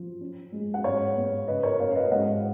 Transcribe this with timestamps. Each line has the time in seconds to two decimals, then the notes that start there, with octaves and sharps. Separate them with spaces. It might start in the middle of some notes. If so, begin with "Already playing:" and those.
Already playing: F3
0.21 C#4
0.52 G#3
0.74 F#5
0.84 G#2 C#5 F5
1.16 B3
1.48 C#3 B4 D#5
1.63 A#4 C#5
1.80 B3 C#5 F5
1.91 F5
1.95 B4 D#5
2.11 G#2 D#5 F#5